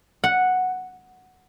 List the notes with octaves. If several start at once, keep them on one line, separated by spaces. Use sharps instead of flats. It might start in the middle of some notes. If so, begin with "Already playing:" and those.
F#5